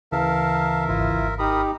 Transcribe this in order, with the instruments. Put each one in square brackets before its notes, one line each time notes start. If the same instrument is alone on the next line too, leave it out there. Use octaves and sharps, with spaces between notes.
[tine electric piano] D2 C#3 E3 [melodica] A#4 E5 [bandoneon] F5 A5
[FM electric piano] G#1 [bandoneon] E4 F4
[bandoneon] D#4 G4 [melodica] A#4 B5 D#6